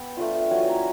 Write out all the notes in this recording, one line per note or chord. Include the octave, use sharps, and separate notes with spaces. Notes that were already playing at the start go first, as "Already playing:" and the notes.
Already playing: B3 G5
A3 D4 F4
F#3 B3 E4 F#5 G#5
G#5 A#5